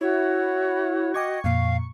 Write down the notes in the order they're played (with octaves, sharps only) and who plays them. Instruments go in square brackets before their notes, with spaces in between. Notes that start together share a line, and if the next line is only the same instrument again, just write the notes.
[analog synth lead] E4 [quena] F#4 [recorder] C#5
[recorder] D#5 [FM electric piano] G5 D6 G#6 [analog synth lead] C#6
[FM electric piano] F2 A#2 [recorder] F5